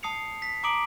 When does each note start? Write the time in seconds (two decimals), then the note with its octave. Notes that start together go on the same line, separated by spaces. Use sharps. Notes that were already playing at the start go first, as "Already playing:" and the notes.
0.03 A5 D#6 C7 C#7 F7
0.42 B6
0.63 A#5 D6 D#6 D7 F#7